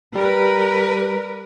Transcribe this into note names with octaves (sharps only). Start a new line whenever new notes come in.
G3 A#4 B4